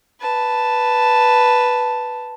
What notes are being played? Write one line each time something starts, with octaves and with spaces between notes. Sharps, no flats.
B4 A5